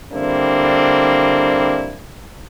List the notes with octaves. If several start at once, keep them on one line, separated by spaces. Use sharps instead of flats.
D3 G3 A#3 C4 D4 E4